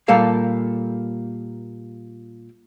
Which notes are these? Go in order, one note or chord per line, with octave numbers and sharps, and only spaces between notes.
A#2 G3 A#3 A4 F5